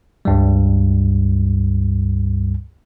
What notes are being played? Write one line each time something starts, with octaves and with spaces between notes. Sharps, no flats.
C#2 G2 G3